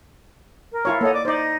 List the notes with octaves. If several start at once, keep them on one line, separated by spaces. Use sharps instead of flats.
A#4
E4 F4 C#5
A#3 A4 C#5 D#5 F#5
D5 D6
D#4 C5 D5 D#5